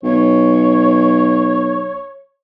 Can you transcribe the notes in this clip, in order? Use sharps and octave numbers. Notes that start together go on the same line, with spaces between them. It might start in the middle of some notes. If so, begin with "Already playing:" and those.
B1 C#5